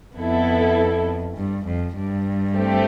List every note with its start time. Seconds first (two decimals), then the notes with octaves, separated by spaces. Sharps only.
0.16 F2 B3 E4 A4
1.36 G2
1.65 F2
1.95 G2
2.54 A3 C4 G4